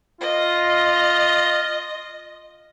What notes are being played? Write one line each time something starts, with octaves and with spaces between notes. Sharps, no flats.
F4 D#5